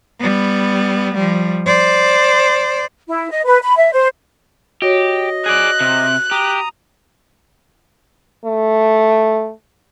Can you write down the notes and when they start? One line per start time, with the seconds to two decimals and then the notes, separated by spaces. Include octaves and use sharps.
0.20 G3 B3
1.14 F3 G3
1.66 C5 D5
3.08 E4
3.31 D#5
3.45 B4
3.63 B5
3.76 E5
3.92 C5
4.82 F#4 G4 C#5 D#5
5.46 G#4 D5 F#6
5.80 C3
6.31 G4 A#5 D#6
8.45 A3